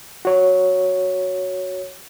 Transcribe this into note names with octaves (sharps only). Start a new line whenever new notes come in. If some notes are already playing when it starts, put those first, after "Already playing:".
F#4 C#5